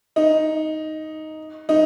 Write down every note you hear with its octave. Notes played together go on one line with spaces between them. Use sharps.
D#4
D#4